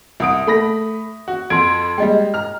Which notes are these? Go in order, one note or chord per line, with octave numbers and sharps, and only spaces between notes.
C2 E5 D#6 D7
A3 B5 A#6
F#4
F2 C6 G#6 D7
G3 G#3 D#5 G5
A#5 F6